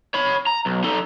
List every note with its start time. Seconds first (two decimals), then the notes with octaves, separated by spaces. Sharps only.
0.14 C#5 B5
0.47 A#5
0.66 B1
0.84 D#4 A4